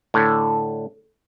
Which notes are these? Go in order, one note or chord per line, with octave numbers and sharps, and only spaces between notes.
A2 D3